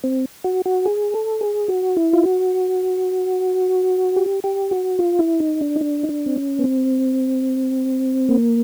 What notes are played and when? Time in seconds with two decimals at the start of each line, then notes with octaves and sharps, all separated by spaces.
0.04 C4
0.44 F#4
0.66 F#4
0.85 G#4
1.14 A4
1.41 G#4
1.68 F#4
1.96 E4
2.13 F4
2.24 F#4
4.16 G4
4.44 G4
4.71 F#4
4.99 F4
5.19 E4
5.40 D#4
5.61 D4
5.76 D#4
5.81 D4
6.03 D#4
6.09 D4
6.26 C4
6.36 C#4
6.59 B3
6.64 C4
8.29 A#3